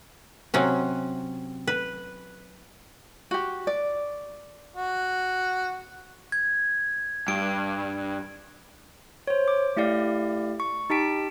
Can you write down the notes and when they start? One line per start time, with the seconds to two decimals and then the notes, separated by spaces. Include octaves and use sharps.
0.54 C3 F#3 C#4
1.67 B4
3.31 F#4 G4
3.67 D5
4.77 F#4
6.32 G#6
7.28 G2 D7
9.27 C5 C#5
9.48 D6
9.77 A3 E4 G4 D5 F5
10.60 C#6
10.90 D#4 G4 A5 B6 D7